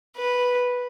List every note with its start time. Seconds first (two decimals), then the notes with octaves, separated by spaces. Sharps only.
0.17 B4